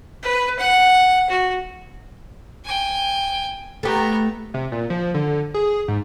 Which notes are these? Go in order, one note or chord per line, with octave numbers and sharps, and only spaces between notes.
B4
F#5
F#4
G5 G#5
A3 B3 G4 A#5
C3
A#2
F3
D3
G#4
G#2